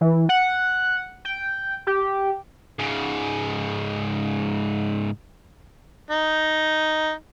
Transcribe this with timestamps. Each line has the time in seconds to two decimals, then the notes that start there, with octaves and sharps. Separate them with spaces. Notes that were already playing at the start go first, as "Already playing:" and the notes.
0.01 E3
0.29 F#5
1.25 G5
1.87 G4
2.79 G#2 C#3
6.11 D#4